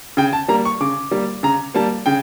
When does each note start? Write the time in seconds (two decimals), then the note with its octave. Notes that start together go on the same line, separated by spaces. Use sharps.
0.17 C#3 G5
0.33 A5
0.48 G3 A#3 A#5
0.65 C#6
0.81 C#3 D6
1.11 G3 A#3
1.43 C#3 A#5
1.74 G3 A#3 A5
2.06 C#3 G5